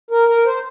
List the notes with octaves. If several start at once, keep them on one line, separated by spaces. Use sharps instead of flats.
A#4
A#4
C5